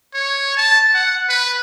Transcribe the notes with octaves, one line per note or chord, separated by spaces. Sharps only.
C#5
A5
F#5
B4